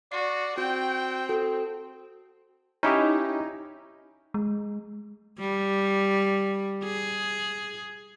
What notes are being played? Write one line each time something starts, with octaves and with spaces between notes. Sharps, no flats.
F#4 D5 C7
C4 F#4 G5 G6
F#4 A4
C#4 D#4 E4 G4
G#3
G3
G#4